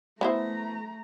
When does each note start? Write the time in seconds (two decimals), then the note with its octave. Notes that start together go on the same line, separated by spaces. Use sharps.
0.21 A3 B3 E4 C5 A#5